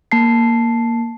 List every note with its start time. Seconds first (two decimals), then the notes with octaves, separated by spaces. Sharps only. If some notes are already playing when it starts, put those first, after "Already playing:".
0.12 A#3 A5 C7